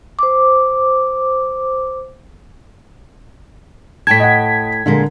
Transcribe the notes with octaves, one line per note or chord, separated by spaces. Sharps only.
C5 D6
A2 G5 A5 G#6 B6
D#5 F#5
F2 A#2 D3 G#3 A#4